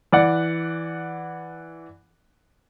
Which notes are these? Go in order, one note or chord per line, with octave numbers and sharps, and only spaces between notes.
E3 D5 F#5